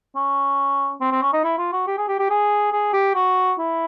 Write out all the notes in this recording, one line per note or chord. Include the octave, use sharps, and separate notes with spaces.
C#4
C4
C4
C#4
D#4
E4
F4
F#4
G4
G#4
G4
G4
G#4
G#4
G4
F#4
E4